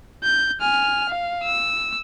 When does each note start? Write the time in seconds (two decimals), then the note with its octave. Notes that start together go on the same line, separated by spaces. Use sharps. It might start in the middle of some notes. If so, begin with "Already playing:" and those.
0.24 G6
0.61 G#5 F6
1.10 F5
1.44 E6